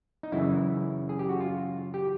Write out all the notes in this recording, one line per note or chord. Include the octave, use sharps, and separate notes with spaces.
D#4
F#2 C#3 E3 E4
G#4
G4
F#4
F4
G4